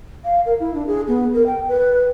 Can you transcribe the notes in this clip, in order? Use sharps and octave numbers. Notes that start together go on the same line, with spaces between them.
F5
A#4
E4
D4
G#4
B3
A#4
G5
B4